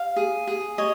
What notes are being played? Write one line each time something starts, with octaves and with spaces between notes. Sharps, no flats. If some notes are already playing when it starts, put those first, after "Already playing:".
Already playing: F5
G#4
G#4
C#5 D#5